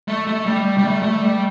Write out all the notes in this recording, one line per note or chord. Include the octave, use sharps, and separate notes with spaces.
A3
A3
G3
G3
A3
A3
G3